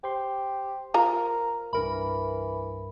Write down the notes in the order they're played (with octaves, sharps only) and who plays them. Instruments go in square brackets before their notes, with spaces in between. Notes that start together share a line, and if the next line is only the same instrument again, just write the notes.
[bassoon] G4 [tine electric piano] C5 C6
[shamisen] F4 A#5 [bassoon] A#4
[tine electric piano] C2 G2 [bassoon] E3 [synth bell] A#4 B5